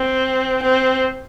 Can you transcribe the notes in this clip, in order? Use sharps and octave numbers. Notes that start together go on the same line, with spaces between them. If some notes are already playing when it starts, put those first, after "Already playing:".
Already playing: C4
C4